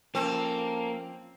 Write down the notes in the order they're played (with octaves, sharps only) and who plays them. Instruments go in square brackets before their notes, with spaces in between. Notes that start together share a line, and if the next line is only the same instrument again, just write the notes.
[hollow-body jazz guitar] F3 C#4 [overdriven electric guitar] A#3 [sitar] C4 [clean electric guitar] A4